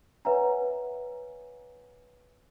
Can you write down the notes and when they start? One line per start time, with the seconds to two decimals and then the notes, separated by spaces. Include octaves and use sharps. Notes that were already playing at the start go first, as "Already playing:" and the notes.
0.25 B4 C#5 E5 F#5 G#5 A#5